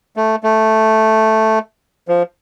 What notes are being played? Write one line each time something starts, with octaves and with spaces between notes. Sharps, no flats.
A3
A3
F3